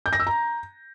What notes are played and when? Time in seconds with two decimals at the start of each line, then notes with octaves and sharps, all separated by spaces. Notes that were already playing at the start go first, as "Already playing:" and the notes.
0.06 G6
0.13 A#6
0.20 E6
0.27 A#5